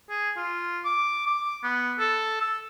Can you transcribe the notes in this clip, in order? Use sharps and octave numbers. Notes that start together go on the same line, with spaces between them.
G#4
F4
D6
D6
B3
A4
E6